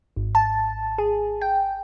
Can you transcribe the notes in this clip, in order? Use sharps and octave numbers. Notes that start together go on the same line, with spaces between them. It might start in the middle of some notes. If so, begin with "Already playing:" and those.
G#1
A5
G#4
G5